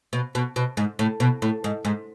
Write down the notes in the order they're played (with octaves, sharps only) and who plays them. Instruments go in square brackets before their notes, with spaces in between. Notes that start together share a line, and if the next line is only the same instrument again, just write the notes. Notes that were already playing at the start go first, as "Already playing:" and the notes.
[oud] B2
B2
B2
G#2
A2
B2
A2
G#2
G#2